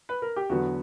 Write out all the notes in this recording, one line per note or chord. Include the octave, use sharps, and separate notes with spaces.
B4
A#4
G4
E2 D3 F#3 B3 F#4